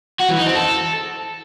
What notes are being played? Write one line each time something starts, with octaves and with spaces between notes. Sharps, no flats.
F#4
E3
D#4
C4
A4